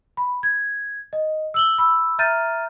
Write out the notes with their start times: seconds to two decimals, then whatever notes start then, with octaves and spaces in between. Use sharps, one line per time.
0.17 B5
0.43 G#6
1.13 D#5
1.54 E6 F#7 G7
1.78 B5 E6
2.19 E5 A#5 F6 G6 A6 D#7